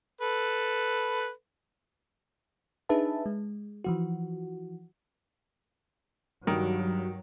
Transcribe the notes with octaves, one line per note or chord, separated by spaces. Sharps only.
A4 B4
D4 D#4 G#4 B4 E5 A5
G#3
E3 F3 F#4
G2 D#3 F#3